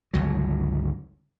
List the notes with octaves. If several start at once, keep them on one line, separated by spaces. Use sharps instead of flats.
G1 C#2 F#3